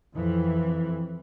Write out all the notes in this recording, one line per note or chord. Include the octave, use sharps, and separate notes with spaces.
F2 E3